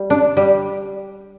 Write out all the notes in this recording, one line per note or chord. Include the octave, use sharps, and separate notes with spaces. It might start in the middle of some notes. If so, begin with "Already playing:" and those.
Already playing: G3
D4
G3